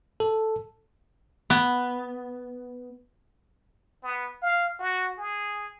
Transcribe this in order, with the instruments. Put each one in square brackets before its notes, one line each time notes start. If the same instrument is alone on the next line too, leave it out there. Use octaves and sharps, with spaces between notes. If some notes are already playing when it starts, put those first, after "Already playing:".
[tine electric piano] A4
[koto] B3
[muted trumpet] B3
F5
F#4
G#4